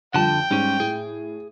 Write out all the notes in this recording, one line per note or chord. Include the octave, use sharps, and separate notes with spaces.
F2 D3 G3 F4 G5 A5
G#2 G3 C#4
A2 G#4